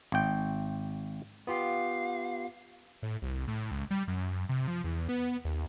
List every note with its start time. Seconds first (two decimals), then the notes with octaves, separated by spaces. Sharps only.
0.12 G#1 G5
1.47 B3 F4 G4 F5
3.02 A2
3.22 C2
3.48 A2
3.71 C#2
3.91 G3
4.08 F#2
4.49 C3
4.68 F3
4.84 E2
5.09 B3
5.45 D#2